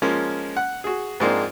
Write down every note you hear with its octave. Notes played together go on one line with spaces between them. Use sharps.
F3 G#3 A#3 C#4
F#5
F#4 G#4
G#2 F3 G#3 A#3 C4 D4